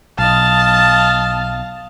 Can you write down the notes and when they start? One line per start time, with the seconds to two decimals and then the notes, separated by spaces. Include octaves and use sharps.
0.19 B1 D#5 F5 A5